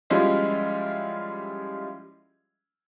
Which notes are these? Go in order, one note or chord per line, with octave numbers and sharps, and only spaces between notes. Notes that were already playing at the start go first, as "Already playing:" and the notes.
F3 G3 G#3 C#4 E4 F4